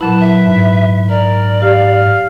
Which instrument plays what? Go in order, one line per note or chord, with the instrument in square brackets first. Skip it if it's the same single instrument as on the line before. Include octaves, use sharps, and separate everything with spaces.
[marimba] A#2 F#3 E4 [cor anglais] B4 [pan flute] A5
[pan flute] E5
[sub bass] G#2
[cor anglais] A#4 [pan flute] D5
[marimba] G4 [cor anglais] F5